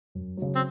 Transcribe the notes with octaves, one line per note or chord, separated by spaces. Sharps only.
F#2
C#3 F#3
C4